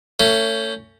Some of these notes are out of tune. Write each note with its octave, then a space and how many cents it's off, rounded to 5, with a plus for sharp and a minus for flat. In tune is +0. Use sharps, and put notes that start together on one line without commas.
A3 +35 C#4 +10